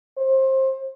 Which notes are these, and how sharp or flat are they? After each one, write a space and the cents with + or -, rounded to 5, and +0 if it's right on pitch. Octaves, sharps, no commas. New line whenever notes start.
C5 +25